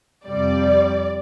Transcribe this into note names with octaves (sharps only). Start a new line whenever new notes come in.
F2 C3 G3 D5